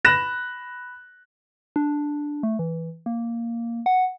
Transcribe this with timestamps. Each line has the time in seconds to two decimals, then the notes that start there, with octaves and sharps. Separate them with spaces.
0.05 B5 F#6 A#6 E7
1.76 D4
2.43 A3
2.59 E3
3.06 A#3
3.86 F#5